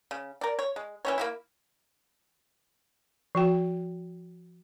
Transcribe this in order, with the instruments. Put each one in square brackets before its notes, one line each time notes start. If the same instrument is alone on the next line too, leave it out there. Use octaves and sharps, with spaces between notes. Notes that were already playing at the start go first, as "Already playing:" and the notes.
[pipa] C#3
A#4 D5
C#5
G#3
E3 C#4 C#5
A#3 B3 E4
[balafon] F3 F#4 G5